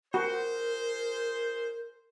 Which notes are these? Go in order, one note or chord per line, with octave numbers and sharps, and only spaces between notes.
F4 F#4 G#4 A#4 C5